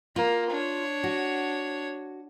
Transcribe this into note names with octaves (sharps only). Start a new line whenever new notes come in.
A#3 F4
D4 C#5
F#4